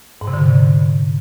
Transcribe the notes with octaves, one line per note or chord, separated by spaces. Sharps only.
G#2
C3
D3